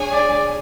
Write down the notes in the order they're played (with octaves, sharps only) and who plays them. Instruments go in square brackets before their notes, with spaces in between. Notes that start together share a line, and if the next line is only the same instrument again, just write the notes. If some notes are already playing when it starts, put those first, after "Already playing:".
Already playing: [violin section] D4 G#4 C#5 G#5
[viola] D5